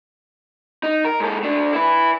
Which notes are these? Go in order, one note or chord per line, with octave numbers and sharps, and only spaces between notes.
D#4
A#4
G#2 A4
A3 D4
E4 B4